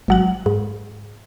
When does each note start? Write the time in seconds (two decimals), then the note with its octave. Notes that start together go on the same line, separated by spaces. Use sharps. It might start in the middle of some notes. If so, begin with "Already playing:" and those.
0.08 G#1 F#3 F#5
0.46 G#2